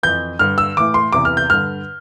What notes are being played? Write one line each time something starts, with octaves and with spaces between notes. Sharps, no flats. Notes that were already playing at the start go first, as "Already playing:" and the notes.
F2 E3 G6
G2 D3 F6
E6
A2 E3 D6
C6
E2 C3 E3 D6
F6
G6
G2 D3 F6